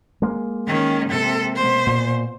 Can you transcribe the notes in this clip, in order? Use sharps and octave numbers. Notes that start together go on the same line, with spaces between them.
G#3 A#3
D#3 C#4
C3 A4
B2 C5
A#2